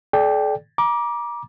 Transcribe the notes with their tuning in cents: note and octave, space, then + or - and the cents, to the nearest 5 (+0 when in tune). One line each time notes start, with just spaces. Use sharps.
A4 -45 D5 +0 G5 +0
A#5 +35 D6 +0